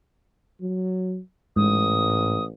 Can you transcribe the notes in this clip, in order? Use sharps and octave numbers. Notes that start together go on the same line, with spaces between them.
F#3
A1 G#2 D#6